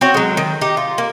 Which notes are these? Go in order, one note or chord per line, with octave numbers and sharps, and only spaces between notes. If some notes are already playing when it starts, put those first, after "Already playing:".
C4 F#4 C#5
F#3 G#3
D#3
D#4 G4
F4
A#3